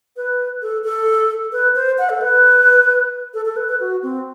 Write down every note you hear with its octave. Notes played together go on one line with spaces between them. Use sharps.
B4
A4
A4
B4
C5
F#5
A4
B4
A4
A4
B4
B4
F#4
C4